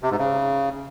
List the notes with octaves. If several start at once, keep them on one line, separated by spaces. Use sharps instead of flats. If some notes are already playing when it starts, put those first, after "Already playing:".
C3
G#2
C#3